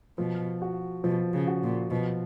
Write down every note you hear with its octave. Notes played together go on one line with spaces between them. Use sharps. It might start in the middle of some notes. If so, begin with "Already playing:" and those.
B2 F3
F#4
B2 F3
C#3
F#4
A#2
B2 F3